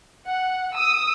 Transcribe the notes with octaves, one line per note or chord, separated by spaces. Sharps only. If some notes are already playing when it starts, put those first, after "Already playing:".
F#5
D#6 E6